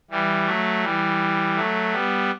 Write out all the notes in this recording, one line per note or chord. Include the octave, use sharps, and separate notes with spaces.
E3 G3
F#3 A3
E3 G3
F#3 A3
G3 B3